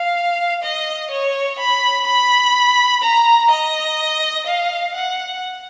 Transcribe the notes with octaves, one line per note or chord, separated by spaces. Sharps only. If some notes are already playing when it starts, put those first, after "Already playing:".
Already playing: F5
D#5
C#5
B5
B5
A#5
D#5
F5
F#5